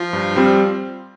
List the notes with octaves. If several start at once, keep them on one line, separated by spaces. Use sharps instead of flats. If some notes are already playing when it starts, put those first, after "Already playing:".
Already playing: F3
G2
G3 C4 F4